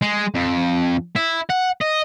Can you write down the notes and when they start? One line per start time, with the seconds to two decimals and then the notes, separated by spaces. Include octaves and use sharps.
0.02 G#3
0.34 F2
1.16 E4
1.50 F#5
1.81 D#5